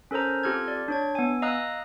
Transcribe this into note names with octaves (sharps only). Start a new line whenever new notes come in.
C#4 A4 A#4 C5 A#5
C4 F4 G4 A4 F6 G#6
D5
D4 C#5 G#6
B3 G#5
D#5 F5 A#5 D#6 E6 F#6